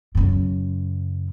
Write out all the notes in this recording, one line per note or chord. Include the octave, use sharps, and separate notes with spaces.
F#2 C#3